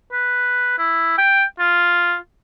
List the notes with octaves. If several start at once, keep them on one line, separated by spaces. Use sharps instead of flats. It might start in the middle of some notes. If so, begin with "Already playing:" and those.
B4
E4
G5
F4